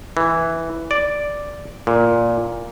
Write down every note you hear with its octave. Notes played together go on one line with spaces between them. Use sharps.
E3
D5
A#2